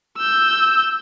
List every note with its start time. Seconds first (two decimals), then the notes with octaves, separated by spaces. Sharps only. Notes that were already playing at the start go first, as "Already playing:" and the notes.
0.18 E6 G6